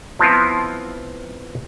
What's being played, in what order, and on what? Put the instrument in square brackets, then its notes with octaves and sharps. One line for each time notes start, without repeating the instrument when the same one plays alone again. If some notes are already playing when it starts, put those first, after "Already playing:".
[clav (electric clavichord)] F3 B3 C4 E4 F4